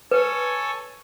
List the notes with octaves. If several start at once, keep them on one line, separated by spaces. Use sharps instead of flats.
A4 B4 C#5 G#5